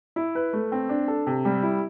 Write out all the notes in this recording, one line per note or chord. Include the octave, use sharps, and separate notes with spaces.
E4
B4
A3
C4
D4
A4
C3
G3
E4